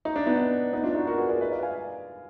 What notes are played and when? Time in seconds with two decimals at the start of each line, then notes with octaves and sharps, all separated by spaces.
0.05 D#4
0.16 D4
0.26 B3 D#4
0.73 B3 D#4
0.84 D4 F4
0.95 D#4 F#4
1.07 F#4 A#4
1.17 G#4 B4
1.29 A#4 D5
1.41 B4 D#5
1.51 D5 F5
1.63 F5 G#5